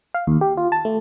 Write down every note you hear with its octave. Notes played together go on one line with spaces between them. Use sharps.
F5
D#2
G4
F4
A5
A3